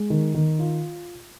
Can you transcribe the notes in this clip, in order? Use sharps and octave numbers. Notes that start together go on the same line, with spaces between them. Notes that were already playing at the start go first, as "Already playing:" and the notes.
Already playing: G#3
D#3
D#3
F4